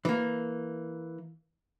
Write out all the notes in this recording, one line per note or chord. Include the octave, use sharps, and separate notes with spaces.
E3 A#3